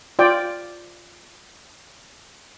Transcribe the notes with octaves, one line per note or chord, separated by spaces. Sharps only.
F4 D5 G5